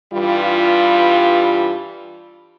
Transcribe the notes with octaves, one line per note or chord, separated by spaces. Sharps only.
G2 E3 G3 F4